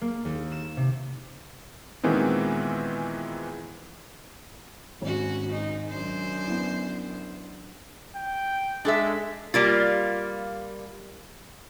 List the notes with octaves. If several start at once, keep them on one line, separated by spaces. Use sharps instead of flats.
A#3
D#2
E7
C3
A#2 D#3 E3 G#3 B3 C4
G#1 C#4 F#4
G#2 D#4
F#2 D4 C5
B3 E4
G5
G#3 D4 A4 E5
G3 A#3 F4